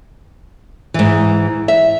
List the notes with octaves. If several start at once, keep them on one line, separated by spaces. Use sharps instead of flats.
G#2 E3
E5